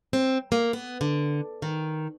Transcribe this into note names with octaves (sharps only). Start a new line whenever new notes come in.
C4
A#3
B3
D3
D#3